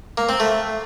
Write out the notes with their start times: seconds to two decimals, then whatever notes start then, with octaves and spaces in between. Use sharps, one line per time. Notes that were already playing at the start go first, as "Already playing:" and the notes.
0.18 A#3
0.29 C4
0.40 A3